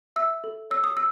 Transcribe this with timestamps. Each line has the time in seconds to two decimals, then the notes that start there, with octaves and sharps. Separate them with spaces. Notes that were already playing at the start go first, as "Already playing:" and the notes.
0.16 E5 E6
0.44 A4
0.70 C#5 E6
0.84 D#6
0.97 E6